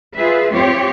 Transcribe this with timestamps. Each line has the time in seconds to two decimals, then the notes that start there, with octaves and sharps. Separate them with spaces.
0.16 F4 G#4 B4 E5
0.52 C4 F4 G4 C#5